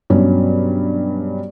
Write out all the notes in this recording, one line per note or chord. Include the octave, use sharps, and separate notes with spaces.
G2 B2 F#3 C#4